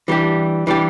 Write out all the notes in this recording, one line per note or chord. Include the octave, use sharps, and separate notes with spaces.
E3 G3 D4 G4
E3 G3 D4 G4